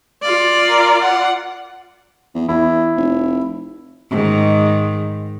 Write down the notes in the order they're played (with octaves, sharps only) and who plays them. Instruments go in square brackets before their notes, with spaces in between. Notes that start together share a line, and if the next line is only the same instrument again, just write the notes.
[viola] F4 D5
[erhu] A#4
F#5
[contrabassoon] E2
[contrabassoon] E2 [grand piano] E4
[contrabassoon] F1
[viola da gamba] G#2 D#3